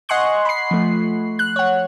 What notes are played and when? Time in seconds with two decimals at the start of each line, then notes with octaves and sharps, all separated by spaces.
0.09 D#5 F#5 G#5 C6 C#6 F#6
0.45 B5 C7
0.71 F3 A3
1.39 F#6
1.56 C#5 F#5